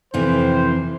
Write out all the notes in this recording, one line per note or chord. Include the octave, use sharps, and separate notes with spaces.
F2 C3 E3 C5